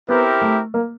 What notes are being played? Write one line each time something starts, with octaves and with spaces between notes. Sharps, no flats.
B3 C4 E4 G4 A#4
A3
A#3